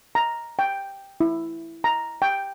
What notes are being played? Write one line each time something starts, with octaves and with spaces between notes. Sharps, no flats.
A#5
G5
E4
A#5
G5